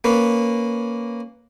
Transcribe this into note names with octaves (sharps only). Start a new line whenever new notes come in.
A#3 C#4 B4